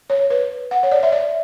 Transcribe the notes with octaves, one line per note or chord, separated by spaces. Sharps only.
C#5
B4
F#5
C#5
D5
E5
D5